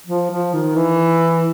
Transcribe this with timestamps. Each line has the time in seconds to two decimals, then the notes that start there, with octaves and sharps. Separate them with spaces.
0.07 F3
0.31 F3
0.53 D#3
0.76 E3